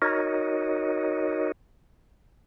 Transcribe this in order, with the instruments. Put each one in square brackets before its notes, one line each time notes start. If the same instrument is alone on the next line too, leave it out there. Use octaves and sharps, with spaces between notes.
[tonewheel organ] D#4 F#4 A#4 C#5 D#5